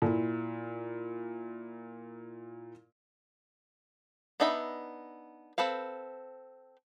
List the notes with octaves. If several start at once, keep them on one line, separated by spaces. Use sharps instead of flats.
A#2 E4
B3 D4 D#4 E5 B5
C4 A4 B4 F5